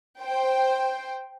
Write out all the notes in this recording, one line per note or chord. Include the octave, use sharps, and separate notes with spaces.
C5 G5